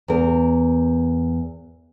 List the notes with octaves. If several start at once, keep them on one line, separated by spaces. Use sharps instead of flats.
E2 A#4